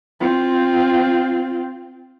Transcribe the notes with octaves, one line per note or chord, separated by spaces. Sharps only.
C4 F4